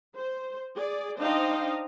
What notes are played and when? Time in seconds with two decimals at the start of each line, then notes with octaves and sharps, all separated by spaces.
0.17 C5
0.75 G#4 D5
1.19 D4 D#4 C5 D#5 F5 G5